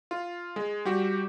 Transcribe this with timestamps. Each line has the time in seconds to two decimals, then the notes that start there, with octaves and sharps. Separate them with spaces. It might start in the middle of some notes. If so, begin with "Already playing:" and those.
0.11 F4
0.56 G#3
0.85 G3 F#4 G4